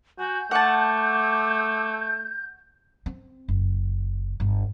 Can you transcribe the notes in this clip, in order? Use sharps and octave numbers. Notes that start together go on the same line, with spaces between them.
F#4 G#5 G6
A3 F#5 A5 D6
C4
F#1
G1